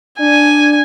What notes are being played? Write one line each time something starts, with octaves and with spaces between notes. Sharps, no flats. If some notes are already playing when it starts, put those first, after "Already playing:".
D4 G#5